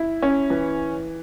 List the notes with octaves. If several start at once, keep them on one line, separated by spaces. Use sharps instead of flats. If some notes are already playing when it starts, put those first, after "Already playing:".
Already playing: E4
C#4
E3